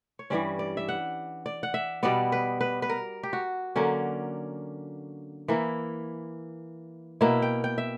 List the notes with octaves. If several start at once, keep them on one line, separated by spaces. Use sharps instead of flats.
C#5
G2 E3 G3 C#4 D5
D5
E5
F#5
D5
F#5
E5
B2 G3 B3 D5
B4
B4
B4
A#4
G4
F#4
D3 F#3 A#3 C#4 D5
E3 A#3 E4
B2 A#3 E4 E5
G5
G5
E5